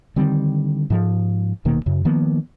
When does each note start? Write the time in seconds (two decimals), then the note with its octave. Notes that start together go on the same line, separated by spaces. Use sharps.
0.16 D3 D#3 G3 C4
0.90 G#2 F3
1.65 D#1 B2 D#3 A#3
1.86 F#2 C#3
2.05 D#3 F3 A#3 B3